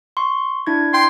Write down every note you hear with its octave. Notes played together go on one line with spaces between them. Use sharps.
C6 C#6
D4 E4 G#6
G5 C6 G6